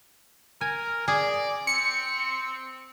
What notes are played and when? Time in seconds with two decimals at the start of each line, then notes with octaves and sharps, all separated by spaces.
0.61 A#4 G#5
1.08 G#4 D5
1.67 C4 C#7